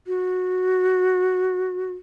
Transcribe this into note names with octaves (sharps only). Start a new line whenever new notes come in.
F#4